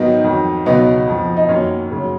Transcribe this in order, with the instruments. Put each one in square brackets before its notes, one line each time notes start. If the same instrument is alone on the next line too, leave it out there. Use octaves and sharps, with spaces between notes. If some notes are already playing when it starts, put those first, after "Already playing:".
Already playing: [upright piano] G#2 D#3 F#3 B3 D#4
F2 D#3 F#3
C#2 B2 F#3 B3 D#4
F2 F3
D#4
F#2 D#3 F#3 A#3 C#4
F#2 C#3 F#3